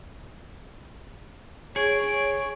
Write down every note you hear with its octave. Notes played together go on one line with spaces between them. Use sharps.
G#4 C#5 D7